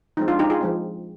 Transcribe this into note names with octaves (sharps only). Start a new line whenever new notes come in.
F3 G#3 C4 D#4
D4 F4
D#4 G4
F4 G#4
F3 G#3 C4